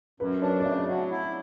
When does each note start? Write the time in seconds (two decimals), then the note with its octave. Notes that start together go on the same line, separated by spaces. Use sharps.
0.20 F#2 B4
0.42 D4 C#5
0.60 D5
0.65 C#3 E5
0.88 F#3
1.11 E4